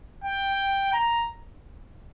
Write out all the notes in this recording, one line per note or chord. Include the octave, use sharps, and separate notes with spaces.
G5
A#5